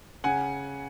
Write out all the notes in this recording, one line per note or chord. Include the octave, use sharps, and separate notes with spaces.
C#3 F#5 G#5